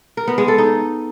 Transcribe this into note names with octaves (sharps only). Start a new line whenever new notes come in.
A#4
B3
G#3
A4
D#4